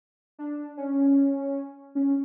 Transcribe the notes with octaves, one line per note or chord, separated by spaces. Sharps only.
D4
C#4
C#4